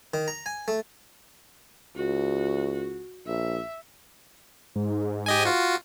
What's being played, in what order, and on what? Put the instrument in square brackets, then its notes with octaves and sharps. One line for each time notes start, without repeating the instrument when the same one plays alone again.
[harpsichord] D#3
A#5
G#5
A3
[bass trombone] C#2 [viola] F#4
[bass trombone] A#1 [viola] E5
[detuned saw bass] G#2
[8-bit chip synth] G4 D#5 G#5
F4 F#4